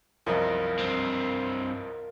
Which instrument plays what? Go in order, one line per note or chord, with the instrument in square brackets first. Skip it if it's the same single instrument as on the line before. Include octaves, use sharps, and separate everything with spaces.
[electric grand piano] C2 F#2 F3 [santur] A#4 D#5 F5
[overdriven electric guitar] G2 C4